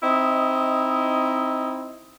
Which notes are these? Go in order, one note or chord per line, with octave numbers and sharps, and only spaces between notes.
C4 D#4 E4 D#5